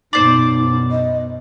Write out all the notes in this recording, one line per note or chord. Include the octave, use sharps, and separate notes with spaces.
F#2 B2 D#4 C5 D5
D#5